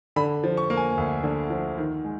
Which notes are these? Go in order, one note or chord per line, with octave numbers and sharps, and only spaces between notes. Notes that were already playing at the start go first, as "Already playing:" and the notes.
D3 B5
F3
C#6
A#3
G#5
D2
D3
F3
D#3
G#3